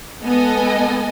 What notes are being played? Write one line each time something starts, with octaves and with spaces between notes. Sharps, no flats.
G#3 B3 A4 D#5 G#5